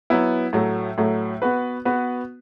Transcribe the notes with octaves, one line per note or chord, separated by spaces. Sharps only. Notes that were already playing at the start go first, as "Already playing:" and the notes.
F#3 B3 E4
A2 F#3 A3
A2 F#3 A3
B3 F#4 B4
B3 F#4 B4